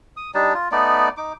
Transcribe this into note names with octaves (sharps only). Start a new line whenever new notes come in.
D#6
G3 D4 D#4 A5
F4
A3 B3 D#4 D5
D#4 D6